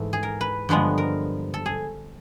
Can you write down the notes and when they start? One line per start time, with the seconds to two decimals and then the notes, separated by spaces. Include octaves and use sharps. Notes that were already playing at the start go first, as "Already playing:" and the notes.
Already playing: G#2 E3 A3
0.13 G#4
0.23 A#4
0.41 B4
0.69 G2 D3 F3 G#3 B3
0.98 A#4
1.54 A4
1.66 G#4